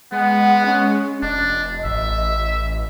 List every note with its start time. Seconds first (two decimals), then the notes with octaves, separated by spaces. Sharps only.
0.12 G#3 B3 F#5
0.66 C#4
1.22 F1 D4 D#5
1.85 A1 E5